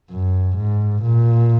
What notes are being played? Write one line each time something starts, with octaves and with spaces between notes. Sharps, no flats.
F#2
G#2
A#2